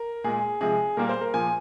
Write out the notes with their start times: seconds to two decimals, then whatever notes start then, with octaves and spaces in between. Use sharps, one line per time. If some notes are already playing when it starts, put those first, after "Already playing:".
Already playing: A#4
0.24 A#2 G#3 G#4
0.61 C3 F3 G#3 G#4
0.97 A#2 G3 A#3 A#4
1.09 C5
1.21 A#4
1.33 A#2 F3 A#3 G#5